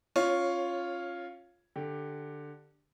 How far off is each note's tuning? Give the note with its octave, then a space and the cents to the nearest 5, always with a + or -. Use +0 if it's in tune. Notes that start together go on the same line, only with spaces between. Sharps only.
C#4 -20 F4 +0 C#5 +0
D3 +10 G4 +5